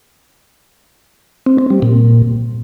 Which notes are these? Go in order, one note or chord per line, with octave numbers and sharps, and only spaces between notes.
C4
C4
G3
A#2